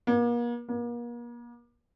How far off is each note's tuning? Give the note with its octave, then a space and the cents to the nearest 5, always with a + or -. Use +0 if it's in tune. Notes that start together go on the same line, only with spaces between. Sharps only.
A#3 +40
A#3 +40